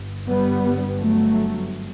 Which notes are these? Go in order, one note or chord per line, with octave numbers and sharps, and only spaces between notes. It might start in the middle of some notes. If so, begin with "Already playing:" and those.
Already playing: G1 G2
G3 B3
F#3 A3